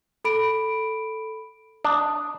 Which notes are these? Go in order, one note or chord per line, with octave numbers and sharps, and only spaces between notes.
A4 B5 D7
D4 D#6